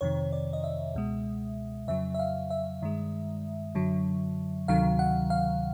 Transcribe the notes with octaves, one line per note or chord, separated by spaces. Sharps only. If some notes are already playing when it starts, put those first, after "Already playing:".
F2 C3 D#3 C#5
D5
D#5
E5
C#2 B2 G#3
F2 C#3 F#3 E5
E5
F5
E5
G2 D#3 G#3
F#2 D3 F#3
D2 C3 D#3 F#3 F5
F#5
F5